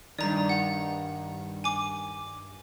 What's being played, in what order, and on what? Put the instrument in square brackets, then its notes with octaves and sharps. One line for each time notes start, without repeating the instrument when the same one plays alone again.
[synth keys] G2 D#3 [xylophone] D5 A#5
[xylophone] F#5
G#5 D6